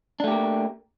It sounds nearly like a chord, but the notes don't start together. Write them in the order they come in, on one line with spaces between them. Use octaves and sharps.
D4 A3 G4 A#3